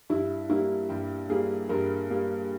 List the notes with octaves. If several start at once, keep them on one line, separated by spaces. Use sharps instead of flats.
G2 E4
G3 A#3 E4
G2 G4
G3 A#3 G#4
G2 A#4
G3 A#3